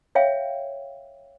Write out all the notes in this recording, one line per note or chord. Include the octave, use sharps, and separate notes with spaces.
C#5 E5 F5 G5